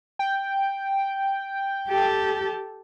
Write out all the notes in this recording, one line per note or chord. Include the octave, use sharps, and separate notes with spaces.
G5
G4 A4